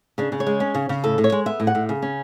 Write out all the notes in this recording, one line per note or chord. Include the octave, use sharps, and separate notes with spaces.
C#3 D4
C#3
C#5
G#3
C#4
C#3
C#3
A2 A4
A2
C#5
G#3
B3 E5
A2
F#5
A2
C#3
C#4